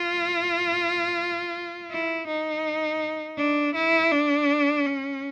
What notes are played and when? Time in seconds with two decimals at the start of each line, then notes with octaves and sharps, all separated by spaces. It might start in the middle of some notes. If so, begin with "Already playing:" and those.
Already playing: F4
1.90 E4
2.27 D#4
3.38 D4
3.75 E4
4.12 D4
4.86 C#4